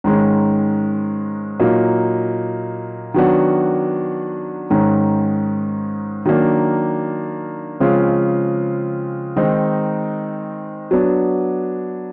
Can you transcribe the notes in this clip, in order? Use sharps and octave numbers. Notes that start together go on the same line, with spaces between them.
G#2 D#3 G#3 C#4
A#2 F#3 A#3 D#4
D#3 F#3 B3 D4 F#4
G#2 D#3 G#3 C#4
D#3 F#3 A#3 D4
C#3 F3 G#3 C4 F4
D#3 G#3 C4 D#4
F#3 B3 D4